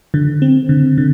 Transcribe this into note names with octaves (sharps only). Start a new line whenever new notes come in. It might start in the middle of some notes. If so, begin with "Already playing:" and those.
D3
C4
D3
D3